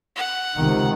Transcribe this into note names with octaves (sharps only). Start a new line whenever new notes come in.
F#5
C#2 C3 D#3